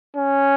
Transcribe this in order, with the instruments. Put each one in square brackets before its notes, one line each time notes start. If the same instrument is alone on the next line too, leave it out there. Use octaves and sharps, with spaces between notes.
[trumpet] C#4